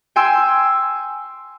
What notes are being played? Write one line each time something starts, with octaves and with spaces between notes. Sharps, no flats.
G5 G#5 C6 E6